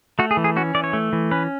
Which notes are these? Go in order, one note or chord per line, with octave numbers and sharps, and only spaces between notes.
A3 F#4
G#4
E3
G#4
C#4 F#4
E3 D5
C#5
A3
E3
C#4 B4